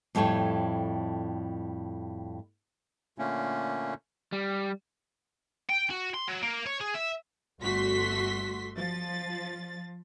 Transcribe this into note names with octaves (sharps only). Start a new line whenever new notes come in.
F2 A2 G3 A3 C#5
A#2 D3 A3 A#3 C#4
G3
G5
F#4
C6
F#3
A#3
C#5
G#4
E5
G1 A3 F#4 C6 B6
F3 A6